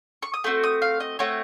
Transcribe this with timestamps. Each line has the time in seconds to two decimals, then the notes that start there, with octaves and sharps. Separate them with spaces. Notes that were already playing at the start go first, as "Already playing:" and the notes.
0.23 C#6
0.34 D#6
0.44 A3 C4 F#4
0.63 D#6
0.82 F5
1.00 D#5
1.19 A3 C4 F#4 C#5